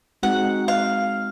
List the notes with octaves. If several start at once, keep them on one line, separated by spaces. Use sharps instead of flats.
G#3 C4 D#4 F#4 F#5
F5